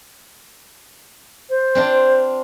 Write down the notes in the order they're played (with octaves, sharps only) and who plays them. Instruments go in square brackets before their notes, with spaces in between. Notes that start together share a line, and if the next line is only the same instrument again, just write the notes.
[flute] C5
[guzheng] C4 D4 F4